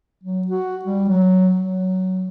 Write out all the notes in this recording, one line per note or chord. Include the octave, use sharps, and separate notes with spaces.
F#3
F#4
G3
F#3
F#3